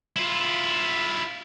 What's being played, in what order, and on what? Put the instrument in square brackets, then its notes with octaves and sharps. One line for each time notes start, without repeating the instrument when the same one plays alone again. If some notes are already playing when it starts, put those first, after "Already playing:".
[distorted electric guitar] E4 F4